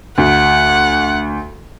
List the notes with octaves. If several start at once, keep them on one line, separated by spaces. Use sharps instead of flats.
D2 F#5